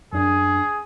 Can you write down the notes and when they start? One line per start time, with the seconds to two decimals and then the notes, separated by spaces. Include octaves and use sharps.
0.13 F#2 D4 G#4